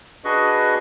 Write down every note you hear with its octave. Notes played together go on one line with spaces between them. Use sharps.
D4 F#4 G#4 B4 D#5 C#6